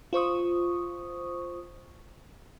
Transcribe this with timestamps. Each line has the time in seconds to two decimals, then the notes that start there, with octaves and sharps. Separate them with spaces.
0.13 F4 C5 C#6 D#6